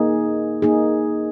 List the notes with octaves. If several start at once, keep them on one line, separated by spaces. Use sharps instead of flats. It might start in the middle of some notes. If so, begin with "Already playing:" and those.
Already playing: A#3 D#4 G#4
A#3 D#4 G#4